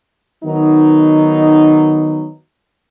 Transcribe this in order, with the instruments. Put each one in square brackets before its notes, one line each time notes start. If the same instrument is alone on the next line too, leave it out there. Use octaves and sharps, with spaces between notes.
[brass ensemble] D#3 F#3 B3 D#4